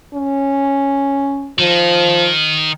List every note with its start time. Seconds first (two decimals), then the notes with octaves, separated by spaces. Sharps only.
0.14 C#4
1.59 D#3 F3